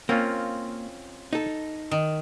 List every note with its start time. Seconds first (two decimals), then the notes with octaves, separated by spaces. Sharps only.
0.09 A#3 C4 C#4 F4
1.33 D#4 A4
1.91 D#3